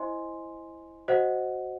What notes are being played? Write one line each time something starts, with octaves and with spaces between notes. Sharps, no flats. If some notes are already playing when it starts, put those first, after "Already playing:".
Already playing: E4 C5 D#5 G#5 C6
F#4 C5 D#5 F#5